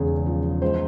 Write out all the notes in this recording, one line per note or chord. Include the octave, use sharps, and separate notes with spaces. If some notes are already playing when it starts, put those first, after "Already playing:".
Already playing: E1 E2 C#3 G#4
F3
C#2 C5